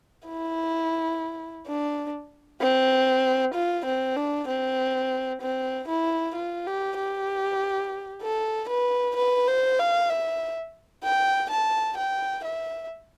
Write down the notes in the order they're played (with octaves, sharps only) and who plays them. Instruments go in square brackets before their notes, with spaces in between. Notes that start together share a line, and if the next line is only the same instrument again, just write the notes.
[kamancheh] E4
D4
C4
F4
C4
D4
C4
C4
E4
F4
G4
G4
A4
B4
B4
C5
F5
E5
G5
A5
G5
E5